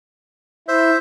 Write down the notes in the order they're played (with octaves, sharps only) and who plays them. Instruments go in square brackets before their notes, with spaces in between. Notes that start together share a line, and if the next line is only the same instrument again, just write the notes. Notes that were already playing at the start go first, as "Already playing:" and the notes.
[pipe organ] E4 [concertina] C5 E5